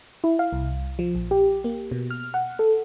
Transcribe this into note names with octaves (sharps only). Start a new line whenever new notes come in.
E4
F5
C2
F3
A#1
G4
A#3
B2
F6
F#5
A4